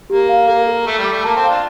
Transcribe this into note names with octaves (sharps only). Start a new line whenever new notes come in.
A#3 G4
F5
A#3 A4
A4
A3 A4
G3
D6
A3
A#3 A5
C4
F5
D4 F4